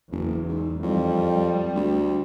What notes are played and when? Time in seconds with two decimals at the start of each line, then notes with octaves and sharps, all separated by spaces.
0.12 F#1 E2
0.49 G#2
0.83 F2 G3
1.75 D2